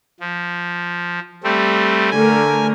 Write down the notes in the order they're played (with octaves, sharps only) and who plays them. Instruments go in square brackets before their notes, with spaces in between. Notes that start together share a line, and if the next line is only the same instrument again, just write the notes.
[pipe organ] F3
G3 A3 C4
[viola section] D3 A3 A#4 [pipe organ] G#5